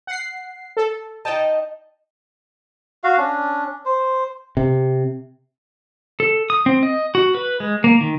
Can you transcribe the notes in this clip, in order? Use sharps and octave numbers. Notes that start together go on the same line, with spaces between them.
F#5 C7
A4
D#4 D#5 G5 A5
F#4 F5
C#4 D4
C5
C3
A4
D#6
C4
D#5
F#4
B4
G#3
A#3
D#3